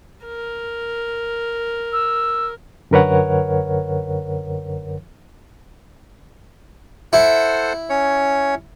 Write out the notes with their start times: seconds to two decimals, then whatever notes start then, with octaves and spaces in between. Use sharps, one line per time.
0.25 A#4
1.93 E6
2.91 F#2 D3 A#4 B4 C#5 F#5
7.13 E4 A4 C5 F#5
7.90 C#4 C#5